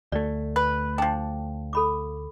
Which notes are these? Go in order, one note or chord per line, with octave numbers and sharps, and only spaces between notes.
D2 A3 D5
B4
F3 D4 G5
A4 B5 D6